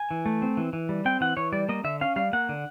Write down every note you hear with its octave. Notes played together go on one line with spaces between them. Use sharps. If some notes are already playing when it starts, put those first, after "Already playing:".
Already playing: G#5
E3
A3
C4
E3
E3
G3
C4 G5
E3 F#5
E3 C#5
G3 D5
A#3 D#5
D3 E5
C#4 F5
G3 F5
A#3 F#5
D3